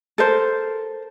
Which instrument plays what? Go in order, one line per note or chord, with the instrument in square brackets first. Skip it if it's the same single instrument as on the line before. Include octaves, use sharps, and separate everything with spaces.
[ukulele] A4 A#4 C5